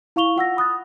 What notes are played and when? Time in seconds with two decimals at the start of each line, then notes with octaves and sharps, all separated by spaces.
0.16 E4 F5 C#6 F7 G7
0.36 F4 F#5 E6 A#6
0.57 B5 D#6 F#6 A6